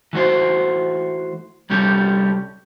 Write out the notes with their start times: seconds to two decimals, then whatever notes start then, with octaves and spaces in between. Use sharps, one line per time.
0.13 E3 A3 F#4 C5
1.70 C2 G3 C#4 G4 A4